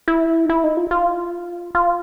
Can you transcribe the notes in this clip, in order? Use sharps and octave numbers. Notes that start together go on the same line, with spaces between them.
E4
D#4
E4
D#4
F4
F4
F4